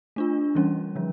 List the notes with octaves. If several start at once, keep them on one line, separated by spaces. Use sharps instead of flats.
A3 D4 F4
E3 G3 C#4
D3 F3